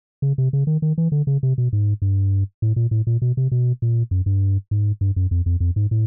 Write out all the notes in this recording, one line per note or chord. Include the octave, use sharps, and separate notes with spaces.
C#3
C3
C#3
D#3
D#3
E3
D3
C#3
C3
B2
G#2
G2
A2
A#2
A2
A#2
B2
C3
B2
A#2
F#2
G2
G#2
G2
F#2
F2
F2
F2
G#2
A2